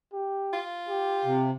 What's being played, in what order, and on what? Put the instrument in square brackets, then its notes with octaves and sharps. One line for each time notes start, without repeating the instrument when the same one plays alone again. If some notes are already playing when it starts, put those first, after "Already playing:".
[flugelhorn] G4
[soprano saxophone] F4
[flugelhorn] G4
[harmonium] C3